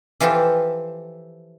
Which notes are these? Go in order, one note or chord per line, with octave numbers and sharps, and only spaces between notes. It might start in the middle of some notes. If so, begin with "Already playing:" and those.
E3 F3 F4 G4 A4